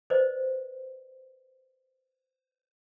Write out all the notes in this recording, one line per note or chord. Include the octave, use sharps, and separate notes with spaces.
B4 C5 D5 D#5